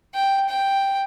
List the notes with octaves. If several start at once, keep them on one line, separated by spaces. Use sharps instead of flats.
G5
G5